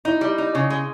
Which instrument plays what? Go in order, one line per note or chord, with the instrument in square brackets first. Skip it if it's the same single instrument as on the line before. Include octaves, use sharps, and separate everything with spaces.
[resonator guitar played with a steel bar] D#4 [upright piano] E4
[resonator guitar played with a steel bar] G3
D#4
C#3
G#3